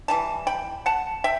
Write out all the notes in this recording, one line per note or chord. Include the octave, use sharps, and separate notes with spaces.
E3 G3 A5
G5 B5
F#5 A5
E5 G5